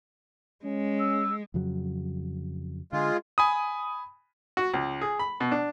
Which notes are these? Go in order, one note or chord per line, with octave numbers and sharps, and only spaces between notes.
G#3 C#4
E6
F2 C#3 F#3
D3 G#3 F4
G#5 B5 D#6
F#4
C#2
G#4
B5
B2
D4